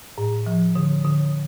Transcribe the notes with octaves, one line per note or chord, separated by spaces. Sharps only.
A2
F3
D3
D3